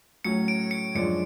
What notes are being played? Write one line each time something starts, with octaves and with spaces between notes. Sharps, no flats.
A2 F#3 C#4 C#7
D7
C#7
F#2 F3 G#3 D4 C#7